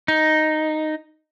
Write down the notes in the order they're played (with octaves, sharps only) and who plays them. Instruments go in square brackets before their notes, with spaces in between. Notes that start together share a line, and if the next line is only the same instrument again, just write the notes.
[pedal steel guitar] D#4